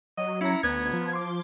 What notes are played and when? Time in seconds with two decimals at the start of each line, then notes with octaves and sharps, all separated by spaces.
0.17 F#3 D#5
0.41 C#4 E4 A#5
0.63 D2 B3 G#6
0.93 F3
1.13 C6 D6